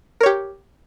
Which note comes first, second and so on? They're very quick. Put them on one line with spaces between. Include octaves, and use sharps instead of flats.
A#4 C#5 G4